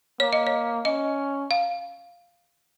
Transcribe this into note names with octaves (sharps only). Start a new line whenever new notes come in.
A#3 C#5
D#5
C#5
C#4 D#5
F5